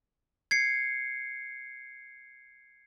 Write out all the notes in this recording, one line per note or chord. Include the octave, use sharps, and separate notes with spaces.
G#6 C7 C#7